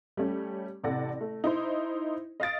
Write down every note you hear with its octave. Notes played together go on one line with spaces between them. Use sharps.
G3 A3 C#4
A1 C3 A4 D5 F#5 A#6
A3
D#4 E4 C5
D#5 F5 D#6 A6 D7